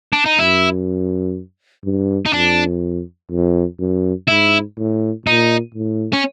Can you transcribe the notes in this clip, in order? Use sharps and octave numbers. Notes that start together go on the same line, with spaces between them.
D4
D#4
F#2 E4
G2
D#4
F2 D4
F2
F#2
G#2 E4
A2
A#2 D#4
A2
C#4